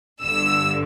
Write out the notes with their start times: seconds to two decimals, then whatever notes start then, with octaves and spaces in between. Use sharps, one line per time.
0.23 G1 G2 D3 E6